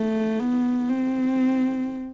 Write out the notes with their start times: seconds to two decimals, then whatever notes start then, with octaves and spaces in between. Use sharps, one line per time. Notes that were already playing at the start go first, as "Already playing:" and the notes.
Already playing: A3
0.40 B3
0.89 C4